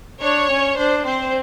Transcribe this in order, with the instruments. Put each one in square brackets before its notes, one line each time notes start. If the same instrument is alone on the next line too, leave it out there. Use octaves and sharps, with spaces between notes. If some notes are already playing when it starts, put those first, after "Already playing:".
[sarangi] D4 [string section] C#5
[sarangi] C#4
[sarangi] D4 [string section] C5
[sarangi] C4 [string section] C5